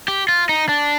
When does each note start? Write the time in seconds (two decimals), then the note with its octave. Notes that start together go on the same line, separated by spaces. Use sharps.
0.08 G4
0.29 F4
0.49 D#4
0.69 D4